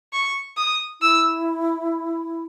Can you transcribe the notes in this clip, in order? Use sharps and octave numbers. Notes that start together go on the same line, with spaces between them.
C#6
D#6
E4 E6